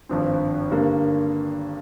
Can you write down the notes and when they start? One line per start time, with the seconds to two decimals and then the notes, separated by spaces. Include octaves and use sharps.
0.09 G#1 G2 F3 C4
0.71 G2 D3 G3 A#3